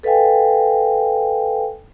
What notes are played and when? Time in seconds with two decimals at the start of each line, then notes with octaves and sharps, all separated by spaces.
0.03 A4 B4 D#5 F5 G5 G#5